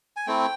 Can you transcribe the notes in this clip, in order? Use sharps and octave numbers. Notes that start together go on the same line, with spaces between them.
G#5
A3 C4 E4 G5